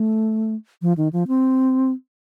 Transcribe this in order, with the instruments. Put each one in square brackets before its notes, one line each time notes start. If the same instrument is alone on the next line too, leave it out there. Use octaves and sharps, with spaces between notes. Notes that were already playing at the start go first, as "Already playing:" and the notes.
Already playing: [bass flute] A3
F3
D#3
F3
C4